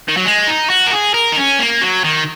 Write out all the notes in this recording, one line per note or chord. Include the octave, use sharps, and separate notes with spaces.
D#3
F#3
G#3
D#4
F#4
A#4
G#4
A#4
D#4
C#4
A#3
F#3
D#3